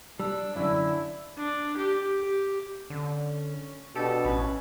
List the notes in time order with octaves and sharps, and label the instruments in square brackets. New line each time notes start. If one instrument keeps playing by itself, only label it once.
[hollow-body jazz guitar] G3 [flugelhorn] D4 [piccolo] E6
[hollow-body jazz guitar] F#2 D3 [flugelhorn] E4 [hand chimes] D5
[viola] D4
G4
G4
[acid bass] D3 [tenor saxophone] C#4
[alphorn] B2 [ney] D4 [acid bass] G4 [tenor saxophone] A4
[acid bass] A1 [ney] C#4 [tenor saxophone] B4